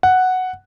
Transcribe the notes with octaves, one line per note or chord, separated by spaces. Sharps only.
F#5